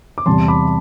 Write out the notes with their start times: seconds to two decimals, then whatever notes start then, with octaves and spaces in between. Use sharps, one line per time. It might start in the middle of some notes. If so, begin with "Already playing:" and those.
0.18 D6
0.26 E2 C3 G3 A5 C6
0.48 B5 D6